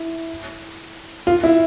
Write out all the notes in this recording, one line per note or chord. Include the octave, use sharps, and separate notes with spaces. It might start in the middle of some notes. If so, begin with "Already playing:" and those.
Already playing: E4
F4
E4